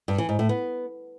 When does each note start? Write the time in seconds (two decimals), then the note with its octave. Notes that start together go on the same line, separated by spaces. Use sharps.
0.08 G2
0.18 E3
0.29 G#2
0.39 A2
0.49 B3